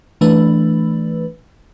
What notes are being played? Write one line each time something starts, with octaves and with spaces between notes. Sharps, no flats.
E3 A3 D4 B4